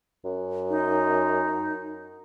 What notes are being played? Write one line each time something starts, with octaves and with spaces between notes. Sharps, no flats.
F#2
D#4